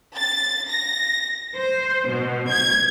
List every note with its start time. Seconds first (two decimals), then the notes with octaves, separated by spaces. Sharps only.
0.16 A6
0.69 A#6
1.56 C5
2.07 B2
2.50 G#6